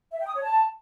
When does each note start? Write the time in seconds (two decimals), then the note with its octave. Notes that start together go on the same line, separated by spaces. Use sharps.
0.11 E5
0.19 G5
0.27 D#6
0.35 C#5
0.43 A5